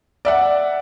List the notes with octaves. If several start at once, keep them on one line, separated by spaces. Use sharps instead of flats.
D5 E5 F#5